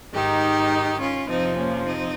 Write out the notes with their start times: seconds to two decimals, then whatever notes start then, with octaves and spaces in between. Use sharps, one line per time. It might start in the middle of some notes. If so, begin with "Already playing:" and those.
0.14 G#2 D#3 D#4 G4
1.00 C#4 F4
1.28 F2 C3 F3 C4 D#4
1.57 A#3 C#4
1.86 C4 D#4